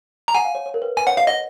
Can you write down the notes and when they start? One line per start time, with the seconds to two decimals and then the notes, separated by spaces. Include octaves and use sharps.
0.28 A#5
0.35 F#5 G#5
0.45 F5
0.55 C#5
0.66 C#5
0.74 A#4
0.82 B4
0.97 B4 G#5
1.07 C#5 F#5
1.17 D#5 F5
1.27 D#5 F#5